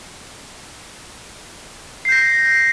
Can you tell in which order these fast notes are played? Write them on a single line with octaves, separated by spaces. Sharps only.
C7 G6 A#6